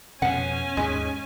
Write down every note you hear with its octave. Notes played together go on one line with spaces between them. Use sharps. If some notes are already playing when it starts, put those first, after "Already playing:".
F2 B2 C#4 F#5 G#5
D#2 G#2 G#3